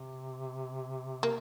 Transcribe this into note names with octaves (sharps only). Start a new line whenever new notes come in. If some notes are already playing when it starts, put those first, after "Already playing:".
Already playing: C3
A#3